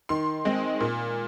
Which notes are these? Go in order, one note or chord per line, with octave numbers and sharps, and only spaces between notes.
D#3 C6
G#3 C4
A#2